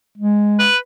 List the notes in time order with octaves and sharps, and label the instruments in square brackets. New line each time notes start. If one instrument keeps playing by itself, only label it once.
[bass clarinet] G#3
[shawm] B4